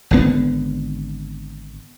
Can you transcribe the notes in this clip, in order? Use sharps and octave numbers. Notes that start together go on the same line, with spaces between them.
G#1 D3 B3